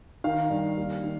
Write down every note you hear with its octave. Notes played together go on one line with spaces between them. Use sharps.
D#3 F5
G2
D#2
D#3